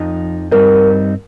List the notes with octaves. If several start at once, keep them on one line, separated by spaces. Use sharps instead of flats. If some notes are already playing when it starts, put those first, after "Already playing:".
Already playing: F2 F3 D#4
G2 G3 C4 D#4 A#4